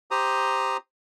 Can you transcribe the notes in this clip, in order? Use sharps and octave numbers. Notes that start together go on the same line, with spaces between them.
G4 C5 A#5 D#6